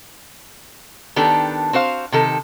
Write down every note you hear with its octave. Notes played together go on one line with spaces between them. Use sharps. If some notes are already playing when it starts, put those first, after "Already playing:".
D#3 B3 D4 G4 A4
C4 F#4 C5 F5
C3 D#3 A4